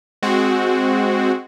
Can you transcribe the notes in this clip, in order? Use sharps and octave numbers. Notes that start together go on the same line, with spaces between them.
G#3 C4 F#4